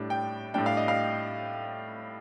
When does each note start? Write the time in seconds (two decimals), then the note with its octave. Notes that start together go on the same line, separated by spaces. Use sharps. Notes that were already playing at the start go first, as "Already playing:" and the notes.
Already playing: A2 G3 D4
0.10 G5
0.54 A2 G3 D4 G5
0.66 F5
0.77 D#5
0.88 F5